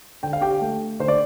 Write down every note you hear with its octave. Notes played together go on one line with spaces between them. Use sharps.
D3 G5
F5
G4 G5
A3
D3 C5
D5